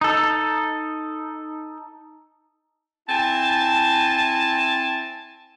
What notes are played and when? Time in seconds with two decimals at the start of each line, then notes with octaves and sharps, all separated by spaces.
0.01 D#4 A4
3.09 C4 E4 G#5 A5